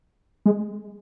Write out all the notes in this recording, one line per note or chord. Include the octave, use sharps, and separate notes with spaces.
G#3